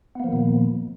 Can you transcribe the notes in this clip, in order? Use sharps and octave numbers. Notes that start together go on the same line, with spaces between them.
A#2 D#3 F3 A#3 B3